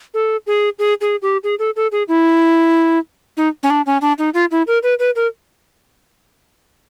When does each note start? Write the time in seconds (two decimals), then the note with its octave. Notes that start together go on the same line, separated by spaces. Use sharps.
0.14 A4
0.47 G#4
0.79 G#4
1.01 G#4
1.22 G4
1.43 G#4
1.59 A4
1.76 A4
1.92 G#4
2.08 E4
3.37 D#4
3.63 C#4
3.70 D4
3.86 C#4
4.01 D4
4.18 D#4
4.34 F4
4.51 E4
4.67 A#4
4.83 B4
4.99 B4
5.15 A#4